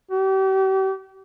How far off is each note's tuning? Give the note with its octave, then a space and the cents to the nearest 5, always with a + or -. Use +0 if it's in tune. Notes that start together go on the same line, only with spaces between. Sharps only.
G4 -40